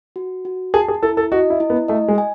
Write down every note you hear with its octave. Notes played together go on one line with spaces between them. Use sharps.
F#4
F#4
G#4 A5
G#4
E4 A4
A4
F#4 D#5
E4
E4
B3
A3 D#5
G#3
G#5